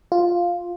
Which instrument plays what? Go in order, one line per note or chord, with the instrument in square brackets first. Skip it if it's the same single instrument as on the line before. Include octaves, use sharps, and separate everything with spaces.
[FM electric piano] F4